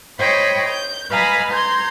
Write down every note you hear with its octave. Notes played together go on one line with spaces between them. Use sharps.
C5 C#5 D#5 G5 B5
G6
B4 D#5 F5 G#5 A#5 B5
A#5 C6 G6 G#6